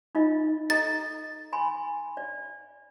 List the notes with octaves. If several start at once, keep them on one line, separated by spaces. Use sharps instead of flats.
D#4 F4 D#5
A4 D#5 A#5 A6
G#5 B5 C6
D5